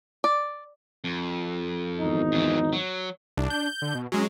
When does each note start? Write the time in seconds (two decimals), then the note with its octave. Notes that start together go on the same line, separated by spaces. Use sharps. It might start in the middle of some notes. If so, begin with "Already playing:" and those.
0.24 D5
1.04 F2
1.99 G#1 E2 D#4
2.32 F2 E3
2.73 F#3
3.38 C2 D4
3.50 G6
3.82 D3
3.95 B2
4.12 F#3 G#3 C#4